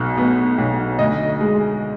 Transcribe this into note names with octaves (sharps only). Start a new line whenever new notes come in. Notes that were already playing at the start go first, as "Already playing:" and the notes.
Already playing: B1 B2
B3
B1
D2 D#5
G#3